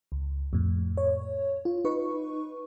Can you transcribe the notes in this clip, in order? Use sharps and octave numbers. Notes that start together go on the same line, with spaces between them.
C#2
F2 A2
C#5
F4
D#4 B4 C#6